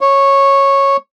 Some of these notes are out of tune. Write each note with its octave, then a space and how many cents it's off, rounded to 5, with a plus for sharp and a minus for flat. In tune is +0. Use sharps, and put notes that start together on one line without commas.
C#5 -10